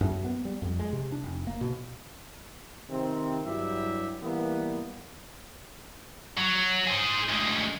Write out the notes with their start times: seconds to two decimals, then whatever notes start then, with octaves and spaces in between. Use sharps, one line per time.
0.01 F#2
0.24 B3
0.45 G3
0.62 F2
0.79 G#3
0.93 C3
1.12 D4
1.23 F1
1.47 A#3
1.61 B2
2.90 C3 D#3 C4
3.46 G2 F#3 E4 G4 E5
4.22 E3 G3 A#3 B3
6.38 F#3
6.87 G#4 C5
7.29 D2 G#3